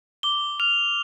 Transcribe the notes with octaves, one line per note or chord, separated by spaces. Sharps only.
D6 G7
F6 F7